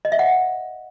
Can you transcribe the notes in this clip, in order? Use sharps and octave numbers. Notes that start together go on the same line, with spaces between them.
D#5
E5
F#5